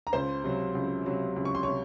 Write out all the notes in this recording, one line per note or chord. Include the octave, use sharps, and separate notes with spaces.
A#5
C#2 C5 C6
C3 F#3
C#2
C3 F#3
C#2
C#6
C6
C3 C#5 C#6